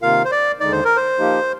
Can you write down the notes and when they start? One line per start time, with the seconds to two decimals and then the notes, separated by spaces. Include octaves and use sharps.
0.02 C3 D#3 A#3 F4 A#4 F5
0.25 C5
0.32 D5
0.60 D#2 D3 G#3 D#4 D5
0.72 C5
0.85 A#4
0.96 C5
1.18 F3 A#3 D#4 G4